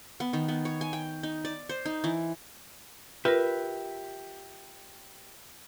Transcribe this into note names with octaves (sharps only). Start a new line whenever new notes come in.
B3
D#3
B3
C#5
G#5
G5
D#4
D5
C5
D#4
E3
F4 G4 A#4 B4 E5